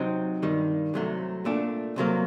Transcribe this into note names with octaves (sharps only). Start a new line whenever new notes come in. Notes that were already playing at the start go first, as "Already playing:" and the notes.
Already playing: C3 F#3 C4 D#4
G2 D#3 G3
C2 C3 F#3 A3
A#2 A3 D4
C2 C3 F#3 A#3